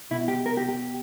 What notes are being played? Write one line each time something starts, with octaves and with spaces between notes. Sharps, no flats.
B2 E4
G4
A#4
G4
G4